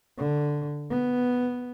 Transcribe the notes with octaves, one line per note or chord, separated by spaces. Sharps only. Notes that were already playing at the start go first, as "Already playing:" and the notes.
D3
B3